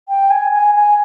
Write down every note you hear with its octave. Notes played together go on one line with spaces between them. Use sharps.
G5
G#5
G#5
G#5